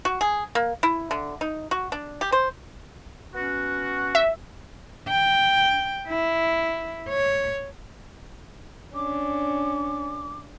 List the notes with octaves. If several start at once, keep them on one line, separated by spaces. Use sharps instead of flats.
F#4
G#4
A#3
E4
D3
D#4
F#4
D4
G4
C5
B3 C#4 F#4
E5
G5
E4
C#5
C#4 D4 D6